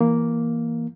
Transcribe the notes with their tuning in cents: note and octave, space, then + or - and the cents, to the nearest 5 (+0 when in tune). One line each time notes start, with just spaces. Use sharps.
E3 +0 A#3 +0